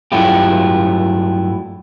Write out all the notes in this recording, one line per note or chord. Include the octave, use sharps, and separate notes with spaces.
G2 F#3 A3 E4 F4 G4